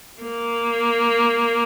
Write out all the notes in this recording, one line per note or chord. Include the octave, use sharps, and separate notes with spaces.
A#3